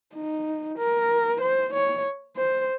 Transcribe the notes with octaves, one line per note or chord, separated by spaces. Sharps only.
D#4
A#4
C5
C#5
C5